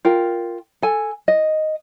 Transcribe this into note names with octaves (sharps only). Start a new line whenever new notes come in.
F4 A#4 G5
A4 G#5
D#5